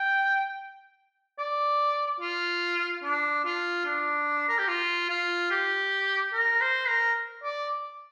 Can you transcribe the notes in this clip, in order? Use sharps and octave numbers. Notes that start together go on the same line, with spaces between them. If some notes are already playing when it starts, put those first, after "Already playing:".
Already playing: G5
D5
F4
D4
F4
D4
A#4
G4
F4
F4
G4
A#4
C5
A#4
D5